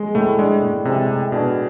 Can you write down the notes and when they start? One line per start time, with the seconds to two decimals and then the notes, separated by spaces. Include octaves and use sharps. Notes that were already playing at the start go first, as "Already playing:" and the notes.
Already playing: G#3
0.15 A2 A3
0.38 G#3 D4
0.62 A2
0.85 C3 G#3
1.08 A2
1.32 B2 D4